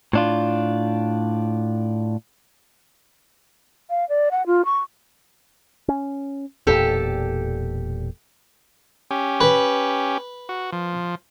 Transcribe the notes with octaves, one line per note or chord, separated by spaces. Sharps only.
A2 D4 F4
F5
D5
F#5
F4
C#6
C#4
E1 E2 A#2 G4 A4
C#4 G4
B4
F#4
F3